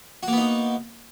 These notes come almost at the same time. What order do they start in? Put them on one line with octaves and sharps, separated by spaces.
F#4 A#3 B3 D#4